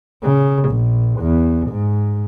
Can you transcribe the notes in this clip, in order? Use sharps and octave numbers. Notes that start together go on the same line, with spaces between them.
C#3
A#1
E2
G#2